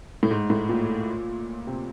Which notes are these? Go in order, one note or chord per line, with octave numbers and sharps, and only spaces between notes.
A2
G#2
A2
A#2
C3